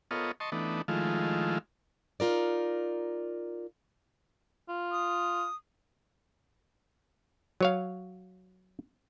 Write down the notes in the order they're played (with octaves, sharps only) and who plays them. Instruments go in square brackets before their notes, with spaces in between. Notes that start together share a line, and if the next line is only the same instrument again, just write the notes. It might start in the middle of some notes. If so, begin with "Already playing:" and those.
[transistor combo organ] B3 F4 A4 A#4 C#5 D#5
D#5 A5 C6 C#6
E3 A3 B3 D4 D#4
D#3 F3 G#3 A3 E4 F4
[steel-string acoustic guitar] D#4 F4 A#4 D5
[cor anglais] F4
[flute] D#6
[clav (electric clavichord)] F#3 C#5 F5